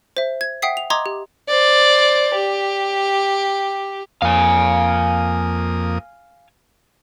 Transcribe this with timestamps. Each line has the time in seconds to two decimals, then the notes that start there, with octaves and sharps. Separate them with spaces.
0.17 C5 E5
0.41 G#6
0.62 E5 F#5 G5 D#6 B6 C7
0.77 F7
0.90 D#5 A#5 C6 D6 D#6 G#6
1.06 G4
1.48 C5 D5
2.34 G4
4.22 F2 A#3 F5 G#5 D#6